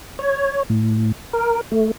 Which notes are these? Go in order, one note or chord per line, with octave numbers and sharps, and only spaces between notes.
C#5
A2
A#4
A3